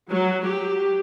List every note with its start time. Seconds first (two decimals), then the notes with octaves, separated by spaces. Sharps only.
0.11 F#3
0.46 G4